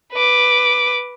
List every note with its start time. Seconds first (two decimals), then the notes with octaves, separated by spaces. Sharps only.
0.13 B4 D6